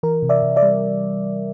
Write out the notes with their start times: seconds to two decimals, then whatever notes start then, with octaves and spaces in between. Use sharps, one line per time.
0.03 E3 A#4
0.23 C3
0.29 D5 E5
0.43 C3
0.56 D5 E5
0.63 G3